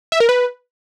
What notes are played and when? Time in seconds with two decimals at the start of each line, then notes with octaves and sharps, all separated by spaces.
0.12 E5
0.20 A#4
0.29 B4